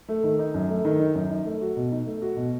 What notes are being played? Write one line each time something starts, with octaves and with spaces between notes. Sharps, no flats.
A3
D#3
D#4
F#2
A3
D#3
D#4
F#2
D#4
A3
F#4
B2
D#4
A3
F#4
B2